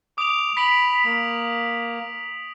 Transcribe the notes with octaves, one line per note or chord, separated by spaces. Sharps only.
D6 D#6 F7
B5 B6 D7 F#7
A#3